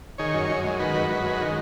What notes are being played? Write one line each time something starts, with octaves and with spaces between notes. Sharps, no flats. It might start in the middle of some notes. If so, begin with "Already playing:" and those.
D#3 G#4 C#5
F#2
F#2
G#3
D#3 F#4 B4
F#2
F#2
G#3
D#3